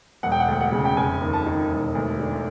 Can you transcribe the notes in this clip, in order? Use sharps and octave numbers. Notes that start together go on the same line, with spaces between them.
E1 F#5
G5
F#5
D2
F#5
C#3
G5
F1 G#5
D#2
A5
D#3
E1
D2
D3